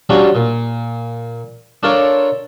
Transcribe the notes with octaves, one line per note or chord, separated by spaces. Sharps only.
F#3 G3 C#4 D4 F4
A#2
D4 F4 A4 A#4 C#5 D5